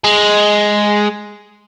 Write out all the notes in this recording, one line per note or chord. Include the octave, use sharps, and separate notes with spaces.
G#3